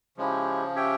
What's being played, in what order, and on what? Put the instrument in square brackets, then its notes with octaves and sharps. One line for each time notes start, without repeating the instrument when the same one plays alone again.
[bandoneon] C#3 F3 [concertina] G#3 C#4 E4 G4
[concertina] C#4 G4 C#5 E5 G5